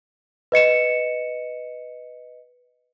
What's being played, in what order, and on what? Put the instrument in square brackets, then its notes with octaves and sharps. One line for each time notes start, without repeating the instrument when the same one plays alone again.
[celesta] B4 D#5 C#7 E7